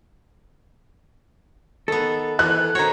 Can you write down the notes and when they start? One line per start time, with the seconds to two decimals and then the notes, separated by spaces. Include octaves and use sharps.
1.88 D#3 B3 A4
2.39 E3 F#6
2.75 D#3 F#4 C5 C#5 A#5